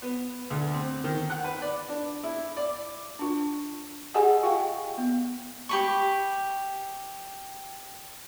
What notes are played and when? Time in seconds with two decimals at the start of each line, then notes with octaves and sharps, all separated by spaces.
0.02 B3
0.50 D2
0.73 C4
1.04 D#3
1.30 F#5
1.44 B4
1.62 D5
1.89 D4
2.23 E4
2.57 D5
3.19 D4 F4
4.14 G4 G#4 D#5 F#5 G#5 A5
4.43 F4 F5 G5
4.98 B3
5.69 G4 B5 C#6